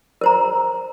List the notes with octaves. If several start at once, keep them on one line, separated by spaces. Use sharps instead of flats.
A#4 C5 A#5